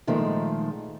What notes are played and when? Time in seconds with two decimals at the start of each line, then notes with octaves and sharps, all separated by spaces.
0.07 A#2 D#3 F3 G#3 A3